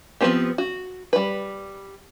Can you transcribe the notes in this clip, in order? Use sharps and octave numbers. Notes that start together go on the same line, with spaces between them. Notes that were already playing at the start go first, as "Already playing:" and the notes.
F3 G#3 B3 C4 G4
F#4
G3 B4